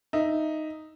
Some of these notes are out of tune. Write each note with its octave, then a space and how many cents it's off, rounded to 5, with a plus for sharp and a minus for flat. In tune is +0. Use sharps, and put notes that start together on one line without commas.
D#4 +0 E5 +0